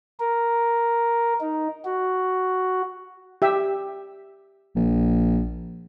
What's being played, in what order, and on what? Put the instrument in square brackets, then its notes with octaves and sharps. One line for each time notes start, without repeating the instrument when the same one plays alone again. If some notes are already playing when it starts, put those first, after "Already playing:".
[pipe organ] A#4
D#4
F#4
[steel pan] G4 E5
[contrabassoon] A#1